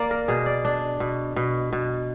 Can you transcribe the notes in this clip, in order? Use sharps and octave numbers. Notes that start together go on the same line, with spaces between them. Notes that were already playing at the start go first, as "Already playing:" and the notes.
Already playing: A#3 D5
A#4
B2 G#4
D5
D4
B2
B2
B2